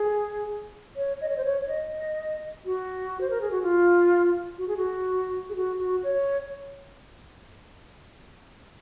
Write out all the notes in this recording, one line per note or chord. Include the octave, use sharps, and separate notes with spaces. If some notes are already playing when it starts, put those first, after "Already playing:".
Already playing: G#4
C#5
D#5
C#5
C5
C#5
C#5
D#5
F#4
C5
A#4
G#4
F#4
F4
F#4
G#4
F#4
G#4
F#4
F#4
C#5